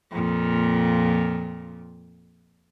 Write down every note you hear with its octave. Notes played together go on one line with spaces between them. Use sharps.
F2 A#2